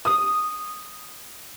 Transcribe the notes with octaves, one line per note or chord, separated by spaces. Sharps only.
D#6